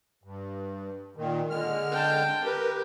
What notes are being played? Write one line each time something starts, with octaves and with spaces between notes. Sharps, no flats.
G2
A#2 D#3
D3 G#3 F6
G5 A5
G4 A#4 B4